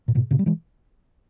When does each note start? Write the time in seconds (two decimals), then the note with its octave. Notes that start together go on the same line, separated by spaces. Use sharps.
0.08 A#2
0.15 G#2 B2
0.31 A#2 C#3
0.39 G3
0.46 E3 G#3